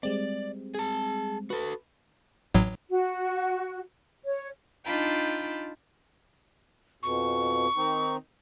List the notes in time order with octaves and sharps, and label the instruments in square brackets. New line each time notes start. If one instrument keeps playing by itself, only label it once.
[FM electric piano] G3 G#3 C4 [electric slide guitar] D5
[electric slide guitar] G#4 A5
[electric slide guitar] F#4 A4 [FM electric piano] B4
[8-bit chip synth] A1 A2 F#3
[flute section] F#4
C#5
[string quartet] D4 D#4 F4 G5 A5 B5
[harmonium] F2 B2 [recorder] C#6
[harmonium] D#3 C4 D#4